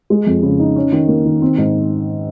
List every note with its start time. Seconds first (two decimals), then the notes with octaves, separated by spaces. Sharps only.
0.10 G#3
0.27 F2
0.43 C#3
0.59 D#4
0.76 C#4
0.92 D#3
1.08 A#3
1.26 D#3
1.41 C4
1.58 G#2